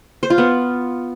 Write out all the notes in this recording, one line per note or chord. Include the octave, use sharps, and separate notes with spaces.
C5
F4
B3